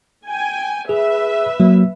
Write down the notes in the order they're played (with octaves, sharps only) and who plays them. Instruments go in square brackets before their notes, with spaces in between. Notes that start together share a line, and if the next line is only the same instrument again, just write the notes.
[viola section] G5 G#5
[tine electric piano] G#4 [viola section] B4 E5
[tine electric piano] F#3 A#3